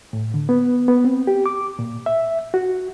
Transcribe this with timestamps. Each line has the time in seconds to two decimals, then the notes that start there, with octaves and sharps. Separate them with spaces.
0.13 A2
0.34 D3
0.49 B3
0.88 B3
1.04 C4
1.27 G4
1.46 D6
1.79 A#2
2.06 E5
2.54 F#4